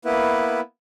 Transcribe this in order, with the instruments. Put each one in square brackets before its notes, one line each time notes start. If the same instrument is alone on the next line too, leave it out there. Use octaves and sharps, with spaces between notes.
[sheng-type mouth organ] A#3 B3 E4 B4